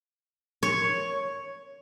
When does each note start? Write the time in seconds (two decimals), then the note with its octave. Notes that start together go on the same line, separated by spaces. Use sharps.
0.63 C#5